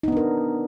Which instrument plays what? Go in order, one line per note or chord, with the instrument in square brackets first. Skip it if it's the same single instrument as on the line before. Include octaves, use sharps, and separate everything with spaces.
[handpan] D#4
B3
D4
A#4